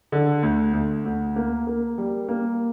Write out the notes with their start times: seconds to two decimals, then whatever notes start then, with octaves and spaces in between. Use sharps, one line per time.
0.12 D3
0.43 D2
0.73 D2
1.05 D2
1.36 A#3
1.67 A#3
1.98 G3
2.28 A#3